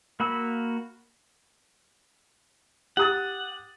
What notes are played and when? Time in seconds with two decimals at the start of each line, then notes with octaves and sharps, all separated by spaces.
0.20 A#3 F#4 B5 E6
2.97 G4 F#5 D#6 A6